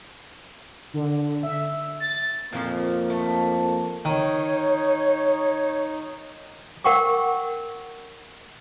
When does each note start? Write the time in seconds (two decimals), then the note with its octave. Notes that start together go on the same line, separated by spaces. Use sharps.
0.94 D3
1.43 E5
2.00 A6
2.52 F2 A#2 E3 F3 A#3
3.10 A3
4.05 D#3 D#4 C#5
6.84 A#4 F#5 G5 C#6 D6